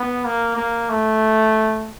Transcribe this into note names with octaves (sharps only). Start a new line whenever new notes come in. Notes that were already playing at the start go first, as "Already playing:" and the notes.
Already playing: B3
A#3
A#3
A3